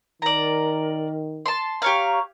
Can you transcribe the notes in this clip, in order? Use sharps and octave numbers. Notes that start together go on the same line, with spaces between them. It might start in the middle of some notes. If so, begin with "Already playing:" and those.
D#3 A#4 D5 A#5
A5 C6
G4 C#5 F5 A#5 C#6